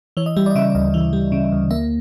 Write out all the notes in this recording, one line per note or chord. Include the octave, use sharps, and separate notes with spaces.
E3 C#5
D#5
G3 E5
D5
D#5
C#3 E5
D5
D2 D#5
E3
G3
C#3
D2
A#3 E5